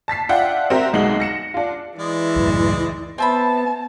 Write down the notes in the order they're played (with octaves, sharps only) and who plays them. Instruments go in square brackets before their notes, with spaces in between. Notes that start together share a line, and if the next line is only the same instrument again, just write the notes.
[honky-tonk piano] A5 A6 B6 C7
D4 F4 E5 F#5 G5
C4 F#4 A#4 E5
B1 G#3 D#4 F#5 F#7
A#6 C#7 E7
D4 F4
[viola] E3 [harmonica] G#3 D5
[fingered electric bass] C#2 F#2 A2
[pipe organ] B3 [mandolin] C4 E5 B5 [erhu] A5